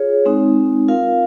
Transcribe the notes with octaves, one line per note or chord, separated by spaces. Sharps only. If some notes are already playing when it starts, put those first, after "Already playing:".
Already playing: F4 G#4 C#5
G#3 C4 D#4
F4 A#4 F5